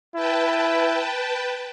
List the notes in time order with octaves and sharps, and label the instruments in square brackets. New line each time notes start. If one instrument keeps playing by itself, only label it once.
[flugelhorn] E4 [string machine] B4 G5 A5